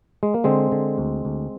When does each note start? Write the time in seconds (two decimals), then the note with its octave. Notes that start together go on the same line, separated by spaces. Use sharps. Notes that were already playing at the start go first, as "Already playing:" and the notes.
0.23 G#3
0.34 A#3
0.44 D3 G#3 C4
0.72 D3
0.98 D2
1.25 D2